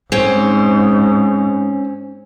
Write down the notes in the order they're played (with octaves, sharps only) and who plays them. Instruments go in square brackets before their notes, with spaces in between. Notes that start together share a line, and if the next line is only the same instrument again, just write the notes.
[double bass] G#2 [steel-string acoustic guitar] C4 C#4